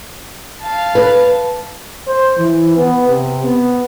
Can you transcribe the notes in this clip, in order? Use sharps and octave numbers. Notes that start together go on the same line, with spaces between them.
F5 A5
B4
C5
E3
B3
C3
B3